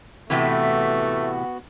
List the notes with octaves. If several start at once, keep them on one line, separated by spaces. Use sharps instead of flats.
A2 C3 E3 A3 B3 F#4